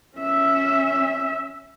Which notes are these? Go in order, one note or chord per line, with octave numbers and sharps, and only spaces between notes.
C#4 E5